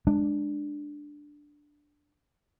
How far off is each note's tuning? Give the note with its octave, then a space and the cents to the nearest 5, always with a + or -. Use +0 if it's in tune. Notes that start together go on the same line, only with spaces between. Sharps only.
G#3 +0 D4 +5